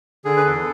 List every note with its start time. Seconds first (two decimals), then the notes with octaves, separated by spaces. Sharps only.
0.25 D3 G#4
0.37 B4
0.46 E2 A4